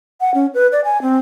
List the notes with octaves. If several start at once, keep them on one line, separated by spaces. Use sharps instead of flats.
F#5
C#4
B4
D5
G#5
C4